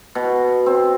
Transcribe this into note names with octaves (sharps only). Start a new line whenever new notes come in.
B2
C4